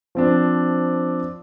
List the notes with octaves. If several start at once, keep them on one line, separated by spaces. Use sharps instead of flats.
F3 C4 D4